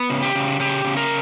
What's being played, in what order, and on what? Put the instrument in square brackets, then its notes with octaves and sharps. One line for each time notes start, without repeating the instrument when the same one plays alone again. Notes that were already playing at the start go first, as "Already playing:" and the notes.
Already playing: [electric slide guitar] B3
C#3
G4
C#3
C#3 G4
C#3
A#4